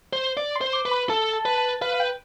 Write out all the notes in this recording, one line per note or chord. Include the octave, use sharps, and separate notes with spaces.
C5
D5
C6
C5
D6
B4
B5
A4 A5
A5
B4
A5
B4 F5
F5
G5